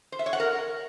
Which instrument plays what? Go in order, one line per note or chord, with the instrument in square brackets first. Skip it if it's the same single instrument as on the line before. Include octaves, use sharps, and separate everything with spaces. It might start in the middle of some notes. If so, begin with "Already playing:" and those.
[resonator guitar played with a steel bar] C5
E5
C#5
F#5
A#4